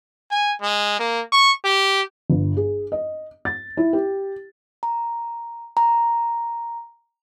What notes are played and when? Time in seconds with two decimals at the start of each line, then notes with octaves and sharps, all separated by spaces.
0.31 G#5
0.61 G#3
0.99 A#3
1.32 C#6
1.64 G4
2.30 G1
2.57 G#4
2.92 D#5
3.45 A6
3.77 E4
3.93 G4
4.83 A#5
5.77 A#5